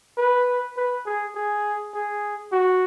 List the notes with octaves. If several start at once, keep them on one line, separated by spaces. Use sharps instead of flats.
B4
B4
G#4
G#4
G#4
F#4